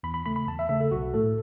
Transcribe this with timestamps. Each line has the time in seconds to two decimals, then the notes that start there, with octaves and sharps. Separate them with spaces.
0.03 E2 B5
0.14 B5
0.26 C#3 A3 B5
0.36 B5
0.48 E2 A5
0.59 E5
0.69 C#3 A3 E5
0.80 A4
0.91 B1 F#4
1.14 A2 A3 A4